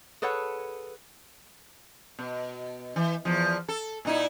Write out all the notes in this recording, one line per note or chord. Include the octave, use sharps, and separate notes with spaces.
G#4 A4 B4 C#5 F#5
B2
E3
E2 F3
A4
A#2 D#4 E4